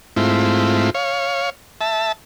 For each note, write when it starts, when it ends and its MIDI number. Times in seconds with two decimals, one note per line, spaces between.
0.16 0.90 44
0.16 0.90 57
0.16 0.90 60
0.16 0.90 64
0.16 0.90 65
0.95 1.50 73
0.95 1.50 77
1.81 2.12 76
1.81 2.12 81